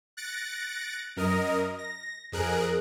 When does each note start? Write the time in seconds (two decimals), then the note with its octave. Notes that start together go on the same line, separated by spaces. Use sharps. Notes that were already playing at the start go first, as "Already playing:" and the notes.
0.17 F#6 A6 A#6 C#7 D7
1.16 F#2 A#4 D#5
1.78 A#6
2.32 F2 G#4 A#4 F#6 D7